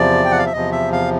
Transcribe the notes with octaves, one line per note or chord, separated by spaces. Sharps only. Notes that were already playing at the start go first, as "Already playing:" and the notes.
Already playing: E2 C3 F3 D5
G5
F#5
F5
E5
E2 C3 F3 D#5
E5
F5